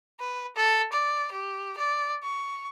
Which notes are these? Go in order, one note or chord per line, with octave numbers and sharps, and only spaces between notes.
B4
A4
D5
G4
D5
C#6